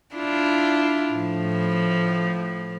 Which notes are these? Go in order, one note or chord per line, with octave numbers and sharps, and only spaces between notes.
D4 E4 F4
A2 F3